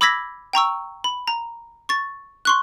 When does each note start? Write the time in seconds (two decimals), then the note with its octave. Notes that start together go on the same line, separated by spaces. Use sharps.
0.01 B5 D6 E6 G#6 A#6 B6
0.53 G5 A#5 C#6 E6
1.04 B5
1.27 A#5
1.89 C#6 A6
2.45 C6 C#6 F#6